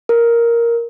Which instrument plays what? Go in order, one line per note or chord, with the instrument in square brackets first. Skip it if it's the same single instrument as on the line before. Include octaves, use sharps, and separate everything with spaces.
[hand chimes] A#4